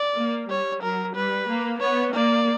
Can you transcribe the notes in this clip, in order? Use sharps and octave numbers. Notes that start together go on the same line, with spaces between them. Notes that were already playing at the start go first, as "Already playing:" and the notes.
Already playing: D5
A#3
G3 C#5
F#3 A#4
G3 B4
A#3
B3 C#5
A#3 D5